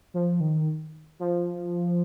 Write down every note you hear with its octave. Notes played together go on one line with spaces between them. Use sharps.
F3
D#3
F3